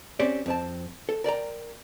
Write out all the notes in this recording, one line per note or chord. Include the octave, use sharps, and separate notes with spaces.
C4 C#4 G4 D5
F2 C4 A5
A4
A#4 D5 G5 A#5